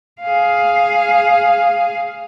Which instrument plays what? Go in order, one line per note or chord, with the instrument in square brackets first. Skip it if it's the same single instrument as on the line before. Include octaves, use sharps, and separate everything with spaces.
[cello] G#4 F5